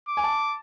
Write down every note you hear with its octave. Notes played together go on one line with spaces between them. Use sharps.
D6
G#5
A5